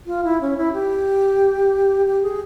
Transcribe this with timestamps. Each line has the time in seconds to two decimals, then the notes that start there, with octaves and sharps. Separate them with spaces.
0.07 F4
0.24 E4
0.41 C#4
0.57 E4
0.73 G4
2.06 G4
2.23 G#4